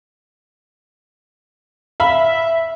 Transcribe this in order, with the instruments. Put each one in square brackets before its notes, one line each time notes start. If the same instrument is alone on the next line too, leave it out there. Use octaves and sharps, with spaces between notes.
[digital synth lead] E5 [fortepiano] F5 B5